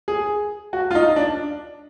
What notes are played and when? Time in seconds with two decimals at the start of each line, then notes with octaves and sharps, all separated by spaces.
0.08 G#4
0.73 F#4
0.91 F4
0.95 D#4
1.16 D4